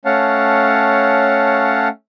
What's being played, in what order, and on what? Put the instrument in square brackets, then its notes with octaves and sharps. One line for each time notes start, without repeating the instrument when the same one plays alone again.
[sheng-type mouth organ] A3 C#4 C#5 F5 F#5 A5